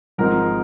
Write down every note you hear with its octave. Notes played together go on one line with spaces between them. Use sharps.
G#1 G#2 F3 C4 D#4 A#4